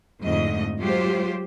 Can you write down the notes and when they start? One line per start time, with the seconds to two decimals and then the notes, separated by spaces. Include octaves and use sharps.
0.23 F2 G#2 D3 A3 D#5
0.79 F#3 G#3 F4 G4 C5